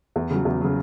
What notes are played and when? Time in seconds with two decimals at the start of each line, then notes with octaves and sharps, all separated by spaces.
0.16 E2
0.31 C#3 F#3
0.45 E2
0.61 C#3 F#3